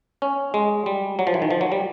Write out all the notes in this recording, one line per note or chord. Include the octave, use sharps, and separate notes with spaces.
C#4
G#3
G3
F#3
F3
E3
D#3
F3
F#3
G3